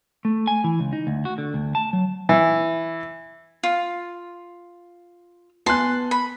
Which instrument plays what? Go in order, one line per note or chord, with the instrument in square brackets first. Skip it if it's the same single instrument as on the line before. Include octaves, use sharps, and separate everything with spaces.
[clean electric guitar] A3
G#5
E3
C#2
D#4
D2
F#4
D3
D2
A5
F#3
[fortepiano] E3
[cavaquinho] F4
[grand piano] B3 G#5 F#6 [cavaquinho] A5 C6
[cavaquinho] B5